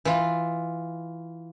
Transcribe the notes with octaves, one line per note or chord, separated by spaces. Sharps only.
E3 F4